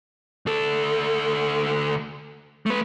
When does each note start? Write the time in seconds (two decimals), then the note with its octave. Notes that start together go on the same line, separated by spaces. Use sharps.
0.46 D2 A4
2.66 A3 B4